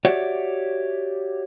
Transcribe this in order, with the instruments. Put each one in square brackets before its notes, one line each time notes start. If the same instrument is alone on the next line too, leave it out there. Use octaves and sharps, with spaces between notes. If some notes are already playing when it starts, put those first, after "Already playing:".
[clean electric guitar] F#4 G4 C#5 D5 E5 F#5